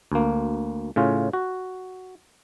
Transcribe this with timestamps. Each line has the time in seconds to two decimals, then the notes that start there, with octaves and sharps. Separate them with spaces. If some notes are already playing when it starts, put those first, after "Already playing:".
0.12 D2 A#3
0.96 A2 C#3 C#4 F4
1.33 F#4